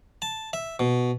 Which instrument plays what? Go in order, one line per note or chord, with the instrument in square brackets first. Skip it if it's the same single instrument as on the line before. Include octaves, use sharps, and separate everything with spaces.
[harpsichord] A5
E5
B2